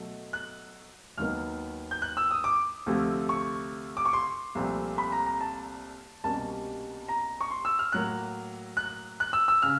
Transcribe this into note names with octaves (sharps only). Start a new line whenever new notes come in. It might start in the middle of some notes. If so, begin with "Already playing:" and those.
Already playing: B2 F#3 A3
F#6
D#2 D#3 F#3 B3 F6
G6
F#6
E6
D#6
D6
D2 C3 F3 A3
C#6
D6
C#6
C6
C2 A#2 F3 A3 C4
B5
A#5
A#5
A5
C2 B2 G3 A#3 C#4 A5
A#5
C#6
C6
E6
F6
A2 F#3 A#3 F#6
F#6
F#6
E6
E6
C#3 F6